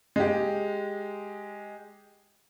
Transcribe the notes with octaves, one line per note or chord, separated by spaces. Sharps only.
G#3 G4